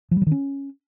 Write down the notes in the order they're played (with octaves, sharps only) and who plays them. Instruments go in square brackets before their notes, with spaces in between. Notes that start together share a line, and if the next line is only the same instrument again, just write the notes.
[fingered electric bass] F3
G3
F3
D#3
C#4